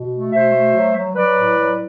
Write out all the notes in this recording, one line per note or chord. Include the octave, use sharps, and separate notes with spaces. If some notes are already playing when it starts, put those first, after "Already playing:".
Already playing: B2
A3
B2 C5 E5
A3
F#3
F#3
F#3 B4 D5
A2
F#3